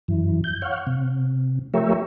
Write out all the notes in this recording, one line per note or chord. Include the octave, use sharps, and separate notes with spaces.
F#2 E3
G6
C#5 F5 F#5
C3
F3 A3 G4 A#4 C#5 E5